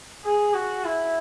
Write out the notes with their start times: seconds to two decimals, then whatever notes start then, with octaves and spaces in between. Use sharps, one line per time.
0.25 G#4
0.54 F#4
0.85 E4